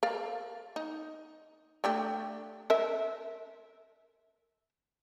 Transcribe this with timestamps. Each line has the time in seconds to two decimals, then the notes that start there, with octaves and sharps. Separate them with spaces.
0.03 A#4 D5 F5
0.76 D#4
1.84 A3 D4 G4
2.70 A#4 E5